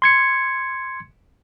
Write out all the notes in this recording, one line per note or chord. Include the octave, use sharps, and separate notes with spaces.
C6 G#6 C#7